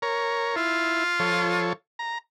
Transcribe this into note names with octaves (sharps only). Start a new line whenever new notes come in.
A#4 C#5
E4 F4
F3 A4 C#5
A#5